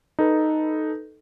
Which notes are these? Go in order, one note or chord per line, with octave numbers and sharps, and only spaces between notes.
D#4 A4 B4